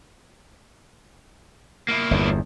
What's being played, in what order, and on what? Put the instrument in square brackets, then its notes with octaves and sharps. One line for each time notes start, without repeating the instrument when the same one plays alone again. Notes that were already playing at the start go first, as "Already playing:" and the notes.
[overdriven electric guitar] A#3 E4
[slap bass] G1 E2